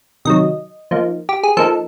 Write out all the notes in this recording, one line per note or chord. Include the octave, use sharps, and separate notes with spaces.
C3 D#3 F#3 D#5
F3 A#3 D#4
G4
G#4
F3 A#3 D#4 A4